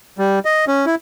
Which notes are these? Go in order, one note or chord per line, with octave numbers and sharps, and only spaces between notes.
G3
D#5
C#4
E4